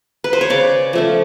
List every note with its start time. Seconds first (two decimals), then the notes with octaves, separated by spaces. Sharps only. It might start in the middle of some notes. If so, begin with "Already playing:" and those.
0.24 B4
0.33 C5
0.41 C#5
0.50 C#3 D5
0.93 F3 A3 C#4